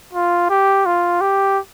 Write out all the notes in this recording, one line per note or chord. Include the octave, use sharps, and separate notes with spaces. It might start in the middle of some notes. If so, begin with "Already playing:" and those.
F4
G4
F4
G4